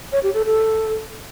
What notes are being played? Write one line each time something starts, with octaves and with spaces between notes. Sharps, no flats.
C#5
G4
A4
A4